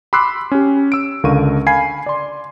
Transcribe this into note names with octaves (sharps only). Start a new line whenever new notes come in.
B5 C6 D6 E6 F#6 C7
C#4 G4
E6 D7
C#2 D3 A#4 F5 C#6 D#7
F5 G#5 B5 G#6 C7
D5 C6